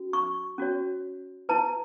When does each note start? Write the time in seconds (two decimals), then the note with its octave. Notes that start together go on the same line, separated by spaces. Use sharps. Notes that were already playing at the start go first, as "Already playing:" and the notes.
Already playing: C#4 F#4
0.13 C#6
0.58 C#4 F#4 C#5
1.49 E4 B4 A5